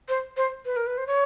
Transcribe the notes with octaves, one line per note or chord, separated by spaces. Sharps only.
C5
C5
B4
A#4
B4
C5
C#5